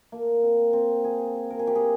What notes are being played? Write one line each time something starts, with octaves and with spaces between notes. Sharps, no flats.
A#3
C4
C4
G#4
A#4
G#4
G4
G#4